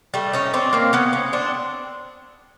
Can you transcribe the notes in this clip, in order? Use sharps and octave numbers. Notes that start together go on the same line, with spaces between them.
G3 A3
C#4 D#4
C4 D4
A#3 C4
B3 C#4
B3 C#4
C4 D4